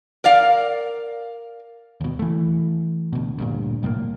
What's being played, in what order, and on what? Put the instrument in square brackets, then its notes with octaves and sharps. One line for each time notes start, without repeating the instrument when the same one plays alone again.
[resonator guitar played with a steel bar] A#4 D5 F5
[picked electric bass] D#2 B2
E3 A3
D2 B2
D2 G2 A#2
C2 A2 F#3 A#3